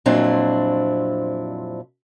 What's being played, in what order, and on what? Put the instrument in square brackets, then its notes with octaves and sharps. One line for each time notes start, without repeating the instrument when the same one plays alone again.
[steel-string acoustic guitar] F2 A#2 F#3 C4 D4 E4